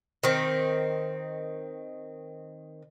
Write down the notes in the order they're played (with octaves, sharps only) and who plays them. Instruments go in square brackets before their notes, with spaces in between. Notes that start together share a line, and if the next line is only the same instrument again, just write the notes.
[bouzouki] D#3 C4